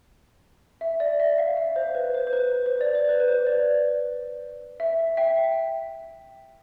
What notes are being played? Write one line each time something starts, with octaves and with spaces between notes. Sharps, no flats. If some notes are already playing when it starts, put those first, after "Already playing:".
E5
D5
E5
F5
E5
C5
B4
C5
C5
B4
C5
D5
C5
B4
B4
C5
D5
E5
E5 G5